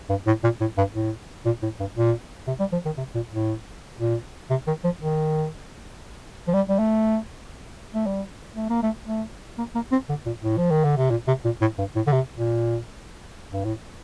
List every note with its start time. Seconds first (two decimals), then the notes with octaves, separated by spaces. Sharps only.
0.09 G2
0.27 A2
0.44 A#2
0.61 A2
0.77 G2
0.94 A2
1.45 A#2
1.62 A2
1.79 G2
1.96 A#2
2.47 C3
2.60 G3
2.72 F3
2.85 D#3
2.97 C3
3.15 A#2
3.32 A2
3.99 A#2
4.50 C3
4.67 D#3
4.84 F3
5.01 D#3
6.47 F3
6.53 G3
6.69 G3
6.79 A3
7.94 A3
8.06 G3
8.56 A3
8.70 A#3
8.82 A3
9.07 A3
9.58 A#3
9.75 A#3
9.92 C4
10.09 D3
10.26 A#2
10.43 A2
10.57 F3
10.71 D#3
10.84 D3
10.97 C3
11.11 A#2
11.27 C3
11.45 A#2
11.61 A2
11.78 G2
11.96 A2
12.07 D3
12.12 C3
12.38 A#2
13.53 G2
13.65 A2